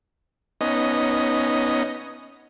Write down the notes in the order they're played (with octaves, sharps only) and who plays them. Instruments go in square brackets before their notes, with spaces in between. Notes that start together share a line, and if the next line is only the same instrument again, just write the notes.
[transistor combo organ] B3 C#4 D#4 D#5